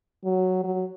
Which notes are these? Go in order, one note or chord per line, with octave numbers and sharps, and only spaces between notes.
F#3
F#3